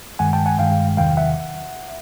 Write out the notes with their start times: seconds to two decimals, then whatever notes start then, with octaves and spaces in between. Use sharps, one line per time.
0.19 G2 D#3 G#3 F#5 G#5
0.33 G5 A5
0.46 F#5 G#5
0.59 G2 D#3 G#3 F5 G5
0.97 E2 C3 D#3 F#3 F5 G5
1.17 E5 F#5